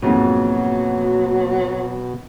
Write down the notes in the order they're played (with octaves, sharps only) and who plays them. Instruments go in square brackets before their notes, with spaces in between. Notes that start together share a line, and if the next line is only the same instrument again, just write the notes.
[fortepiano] F2 G#2 [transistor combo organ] B2 [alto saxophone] F#3 [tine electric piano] A#3 F#4